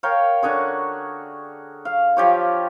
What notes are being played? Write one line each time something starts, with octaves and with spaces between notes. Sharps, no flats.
A#4 C#5 F5 G5
D3 F#4 G#4 C#5
F5
F3 G4 C#5